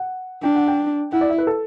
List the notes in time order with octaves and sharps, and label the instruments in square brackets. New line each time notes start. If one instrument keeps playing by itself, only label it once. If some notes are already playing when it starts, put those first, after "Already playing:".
Already playing: [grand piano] F#5
[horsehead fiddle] D4 [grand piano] G5
[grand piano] F#5
G5
[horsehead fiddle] E4 [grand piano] F#5
[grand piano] D5
E5
B4
A4